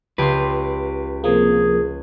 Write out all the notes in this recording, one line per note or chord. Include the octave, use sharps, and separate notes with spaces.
C#2 G4 B4 C6
C3 F3 A#3 G#4